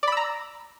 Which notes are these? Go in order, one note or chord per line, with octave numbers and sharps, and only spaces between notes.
D5 A#5 B5 E6